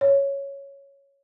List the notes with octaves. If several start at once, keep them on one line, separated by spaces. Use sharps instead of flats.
C#5